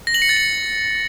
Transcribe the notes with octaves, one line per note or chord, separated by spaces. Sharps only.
A#6
F#7
C#7
A6
C#7